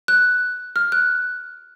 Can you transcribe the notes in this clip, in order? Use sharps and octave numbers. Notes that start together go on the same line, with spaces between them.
F#6
F6
F#6